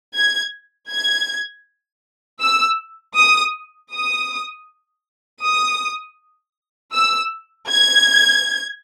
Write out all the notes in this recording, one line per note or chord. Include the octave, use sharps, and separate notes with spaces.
G#6
G#6
E6
D#6
D#6
D#6
E6
G#6